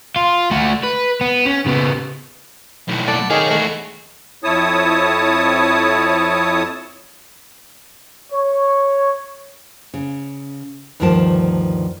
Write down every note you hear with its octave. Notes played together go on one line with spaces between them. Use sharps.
F4
A3 F#4
B4
B3
C#4
C#3 B3
B1 A2
A4 D5 F#5
D#3 G#4 C#5 F5
E3 A3 F#4
F2 E4 C#5 A5 D#6
C#5
C#3
D2 G2 D#3 F3 A#4 A5